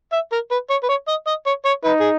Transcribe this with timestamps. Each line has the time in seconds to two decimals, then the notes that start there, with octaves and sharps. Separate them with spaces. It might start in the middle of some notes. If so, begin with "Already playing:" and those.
0.13 E5
0.32 A#4
0.51 B4
0.70 C#5
0.83 B4
0.89 C#5
1.08 D#5
1.27 D#5
1.46 C#5
1.65 C#5
1.84 D#4 B4
2.00 G#4